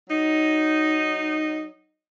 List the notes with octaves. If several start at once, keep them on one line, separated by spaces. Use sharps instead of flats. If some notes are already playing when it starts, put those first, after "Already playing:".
F#3 D#4